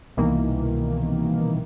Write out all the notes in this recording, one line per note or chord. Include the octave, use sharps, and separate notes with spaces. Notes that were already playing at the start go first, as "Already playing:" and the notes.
C2 B2 D#3 E3 A#3